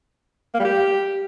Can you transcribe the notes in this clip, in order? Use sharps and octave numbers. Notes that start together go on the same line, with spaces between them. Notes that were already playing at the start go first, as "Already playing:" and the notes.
A#3
G3
G4